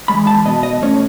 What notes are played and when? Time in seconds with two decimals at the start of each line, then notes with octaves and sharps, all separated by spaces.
0.08 E3 G#3 B5
0.27 A5
0.45 B2 D#5
0.63 D#5
0.82 A3 C#4 C#5